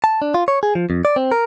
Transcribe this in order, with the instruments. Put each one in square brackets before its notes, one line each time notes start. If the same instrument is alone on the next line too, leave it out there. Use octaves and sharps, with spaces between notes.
[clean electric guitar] A5
D4
F4
C#5
G#4
F3
F2
D5
C4
A#4